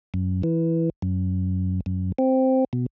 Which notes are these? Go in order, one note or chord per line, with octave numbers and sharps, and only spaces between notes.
F#2
E3
F#2
F#2
C4
B2